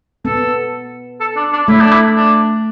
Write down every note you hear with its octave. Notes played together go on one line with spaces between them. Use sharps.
B3 A4
A4
D4
D4
A3 E4
D4
E4
D4